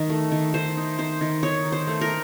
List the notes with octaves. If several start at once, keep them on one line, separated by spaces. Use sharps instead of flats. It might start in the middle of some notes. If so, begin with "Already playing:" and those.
Already playing: D#3 D#4
A3
D#3
D#3 C5
D#4
D#3 C5
D#3
D#4 C#5
D#3
C5
A3
A#4